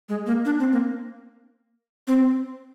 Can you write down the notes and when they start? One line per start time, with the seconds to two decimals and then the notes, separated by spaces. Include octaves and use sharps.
0.09 G#3
0.26 A#3
0.45 D4
0.59 C4
0.72 A#3
2.08 C4